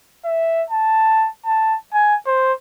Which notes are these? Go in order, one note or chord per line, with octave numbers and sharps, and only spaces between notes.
E5
A5
A5
G#5
C5